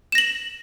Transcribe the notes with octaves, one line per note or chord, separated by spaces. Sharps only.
A#6 E7 F#7